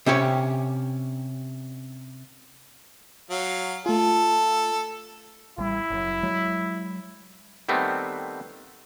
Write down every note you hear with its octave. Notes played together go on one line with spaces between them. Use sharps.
C3 C#4 G4 C#5
F#3 F5
A3 F4 A4
A1 G3 E4
F#1 F#2
F#3 G#3
D#3 G3 A3 B3 C4